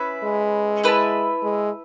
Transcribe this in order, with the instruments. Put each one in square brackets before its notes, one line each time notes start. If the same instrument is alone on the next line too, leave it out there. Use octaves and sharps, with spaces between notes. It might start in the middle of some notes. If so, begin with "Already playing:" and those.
Already playing: [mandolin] C#4 E4 B4 E5
[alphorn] G#3
[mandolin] E4 B4 E5 A5
[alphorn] G#3